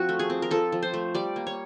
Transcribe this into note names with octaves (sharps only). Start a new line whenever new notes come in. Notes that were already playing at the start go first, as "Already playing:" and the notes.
Already playing: F3 C4 F#4
A3
G#4
C4
A#4
F3 A4
F3
C5
A3
G3 D5
A#3
C#5